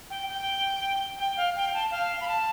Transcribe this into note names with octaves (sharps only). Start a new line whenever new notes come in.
G5
G5
G5
F5
G5
A5
F5
B5
A5